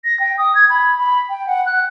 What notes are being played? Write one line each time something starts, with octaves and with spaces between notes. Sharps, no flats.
A#6
G5
D#6
G#6
B5
B5
G5
F#5
F#6